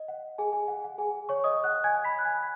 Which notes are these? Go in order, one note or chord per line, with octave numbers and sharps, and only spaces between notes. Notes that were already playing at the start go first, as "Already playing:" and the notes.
Already playing: D#5
F#5
G#4 G#5
G#4 G#5
F#5
F#5
G#4 G#5
C#5 C#6
D#5 D#6
F#5 F#6
G#5 G#6
B5 B6
F#6
G#5 G#6